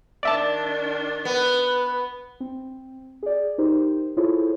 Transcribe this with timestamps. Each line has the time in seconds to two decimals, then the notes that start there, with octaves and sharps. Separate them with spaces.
0.23 D#3 D4 D5 E5 A5
1.25 B3 B4
2.40 C4
3.23 G#4 D5
3.58 D#4 G4 A#4 C5
4.17 E4 F4 G#4 A4 C5 C#5